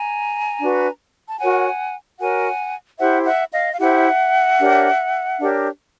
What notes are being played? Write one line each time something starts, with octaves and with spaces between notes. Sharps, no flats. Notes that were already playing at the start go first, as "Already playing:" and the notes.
Already playing: G#5 A#5
D4 F#4 B4
A5
F#4 A#4 C#5 F#5 G#5
F#4 A#4 C#5 F#5 G#5
E4 G4 C5 E5 F#5
E5 F#5
D#5 F5
F5
E4 G4 C5 E5 F#5
D4 G4 A#4 C#5
D4 G4 A#4 C#5